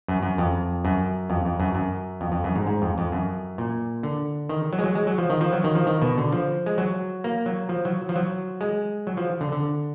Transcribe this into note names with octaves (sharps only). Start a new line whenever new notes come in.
F#2
F#2
F2
F#2
F2
F2
F#2
F#2
F2
F2
F#2
G#2
G#2
F2
F2
F#2
A#2
D3
D#3
F#3
G#3
F#3
G#3
F#3
F3
D#3
F3
F#3
D#3
F3
D#3
B2
D3
F3
G#3
F#3
A#3
F#3
F3
F#3
F3
F#3
G#3
F#3
F3
D3
D3